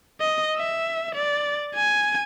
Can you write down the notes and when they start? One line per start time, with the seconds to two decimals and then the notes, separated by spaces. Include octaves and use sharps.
0.21 D#5
0.57 E5
1.15 D5
1.76 G#5